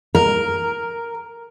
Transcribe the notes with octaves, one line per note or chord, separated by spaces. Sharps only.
A#4